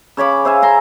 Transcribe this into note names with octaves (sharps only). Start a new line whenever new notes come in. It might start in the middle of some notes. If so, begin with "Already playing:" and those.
C#3 C#5 B5 D6
C5 E5 F5 G#5
G#5 A#5 C6